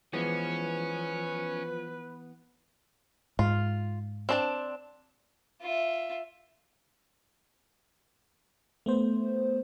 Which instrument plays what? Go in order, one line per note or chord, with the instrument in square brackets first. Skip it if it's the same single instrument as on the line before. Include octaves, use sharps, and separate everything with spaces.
[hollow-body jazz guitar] E3 G#3 B3 [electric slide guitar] F3 [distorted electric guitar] C#4 [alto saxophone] B4
[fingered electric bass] G#2 [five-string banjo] F4
[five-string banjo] C4 D4 A5
[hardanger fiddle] F4 E5
[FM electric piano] A3 B3 C5